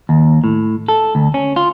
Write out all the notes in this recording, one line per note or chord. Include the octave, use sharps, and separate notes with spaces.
D#2
A2
A4
D2
C#4
F4